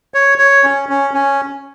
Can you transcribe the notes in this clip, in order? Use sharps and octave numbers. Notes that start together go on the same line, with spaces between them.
C#5
C#5
C#4
C#4
C#4